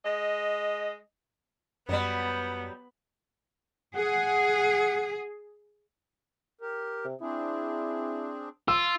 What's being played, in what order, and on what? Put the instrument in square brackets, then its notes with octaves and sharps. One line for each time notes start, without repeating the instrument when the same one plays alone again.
[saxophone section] G#3 D#5
[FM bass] F#2 [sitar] F#3 G3 [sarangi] B3
[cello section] G#4 [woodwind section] F#5
[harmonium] G4 A#4
[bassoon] C3
[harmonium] C4 D4 G#4 [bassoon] E4
[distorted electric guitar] F4 [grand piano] E6